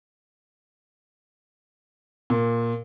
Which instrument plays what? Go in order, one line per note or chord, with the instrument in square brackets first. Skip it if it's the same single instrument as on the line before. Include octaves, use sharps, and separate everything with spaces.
[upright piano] A#2